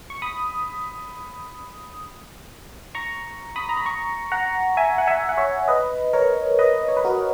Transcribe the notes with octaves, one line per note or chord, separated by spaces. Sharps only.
C#6
B5 D#6
A#5 C#6
B5 D#6
A#5
B5
A#5 C#6
F#5 A#5
E5 G#5
F#5
E5 G#5
F#5
C#5 E5
B4 D#5
A#4 C#5
B4 D#5
C#5
B4
F#4 A#4